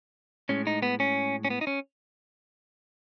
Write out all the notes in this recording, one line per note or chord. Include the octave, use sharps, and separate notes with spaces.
A2 G#3 C#4
D#4
B3
C#4
C#4
B3
D#4
C#4